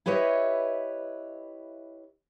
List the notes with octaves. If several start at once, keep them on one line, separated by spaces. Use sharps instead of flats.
E4 G4 B4 C#5 D#5 E5